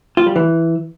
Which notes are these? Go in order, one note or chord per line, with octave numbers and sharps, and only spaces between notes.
F4
G3
E3